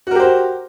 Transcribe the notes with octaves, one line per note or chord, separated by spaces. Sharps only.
F#4 G4 A#4 C5